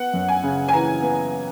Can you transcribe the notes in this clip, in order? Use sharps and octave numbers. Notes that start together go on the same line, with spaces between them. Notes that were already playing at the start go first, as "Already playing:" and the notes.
Already playing: B3 F#5
F#2
G#5
C#3
G#5
E3 A#5
B3